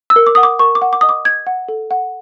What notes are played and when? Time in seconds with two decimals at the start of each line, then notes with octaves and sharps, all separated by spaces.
0.10 E6
0.16 A#4
0.27 D6
0.35 F#5 D#6
0.43 D6
0.59 A#4 C#6
0.75 D6
0.82 F#5
0.93 D6
1.01 D#5 D#6
1.09 D6
1.25 D#5 G#6
1.47 F#5
1.69 A4
1.91 F#5